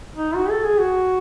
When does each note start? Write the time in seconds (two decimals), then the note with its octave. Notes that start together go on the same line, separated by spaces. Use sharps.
0.14 D#4
0.35 F#4
0.50 A4
0.64 G#4
0.79 F#4